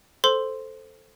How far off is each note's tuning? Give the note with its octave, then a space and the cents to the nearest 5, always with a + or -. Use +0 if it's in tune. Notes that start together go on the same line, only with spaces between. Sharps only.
A4 +0 C5 +0 C6 +0